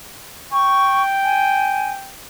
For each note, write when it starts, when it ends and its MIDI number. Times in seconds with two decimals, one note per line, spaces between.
0.52 2.15 79
0.52 1.03 85
1.24 1.92 80